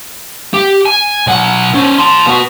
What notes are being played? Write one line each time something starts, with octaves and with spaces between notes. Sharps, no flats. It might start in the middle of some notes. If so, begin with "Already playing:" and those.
G4
G#5
B1 F#5
C#4 C5
A5 C6
B3 F#4